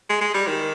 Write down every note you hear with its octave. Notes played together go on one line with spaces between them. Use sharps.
G#3
G#3
G3
D#3